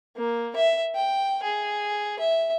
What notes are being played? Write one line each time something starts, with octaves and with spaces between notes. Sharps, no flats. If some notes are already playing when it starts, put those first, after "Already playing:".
A#3
E5
G5
G#4
E5